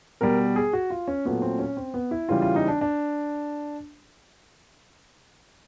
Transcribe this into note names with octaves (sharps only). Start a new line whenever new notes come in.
B2 G3 A#4
G#4
F#4
F4
C#4
A#2 F#3 A3 B3
C4
C#4
C4
B3
E4
C#3 E3 G3 F4
F4
D#4
D4
D4